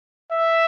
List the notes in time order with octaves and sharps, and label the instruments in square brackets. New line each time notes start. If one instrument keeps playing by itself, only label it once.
[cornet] E5